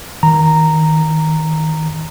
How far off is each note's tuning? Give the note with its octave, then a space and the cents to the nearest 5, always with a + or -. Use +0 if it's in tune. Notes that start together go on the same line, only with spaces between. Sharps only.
D#3 +20 A#5 -10